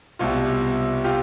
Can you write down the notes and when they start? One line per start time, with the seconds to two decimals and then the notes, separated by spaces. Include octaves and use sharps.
0.19 C2 B2 G3 F4
1.04 F4 G4